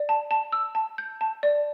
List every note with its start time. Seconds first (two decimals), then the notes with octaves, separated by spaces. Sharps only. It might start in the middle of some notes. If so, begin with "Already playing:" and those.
Already playing: D5
0.09 A5
0.31 A5
0.52 E6
0.75 A5
0.98 G6
1.21 A5
1.43 D5